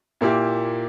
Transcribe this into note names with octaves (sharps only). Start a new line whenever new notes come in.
A#2 A#3 E4 G4